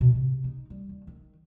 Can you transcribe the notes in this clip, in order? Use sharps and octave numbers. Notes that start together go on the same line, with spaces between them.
B2
C3
D#4
G3
D#2
D#3